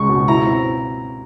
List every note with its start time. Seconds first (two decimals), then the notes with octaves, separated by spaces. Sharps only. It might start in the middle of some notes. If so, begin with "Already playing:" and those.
Already playing: C#2 G#3 C#6
0.09 B2
0.28 E4 A#5
0.46 C4